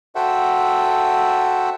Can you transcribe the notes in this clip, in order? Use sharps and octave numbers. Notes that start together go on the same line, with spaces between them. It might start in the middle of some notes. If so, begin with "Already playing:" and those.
F#4 A4 C5 E5 F#5 G5